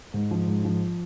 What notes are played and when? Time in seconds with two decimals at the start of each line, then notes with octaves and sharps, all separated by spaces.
0.14 G#2
0.31 F3
0.48 G#2
0.65 F3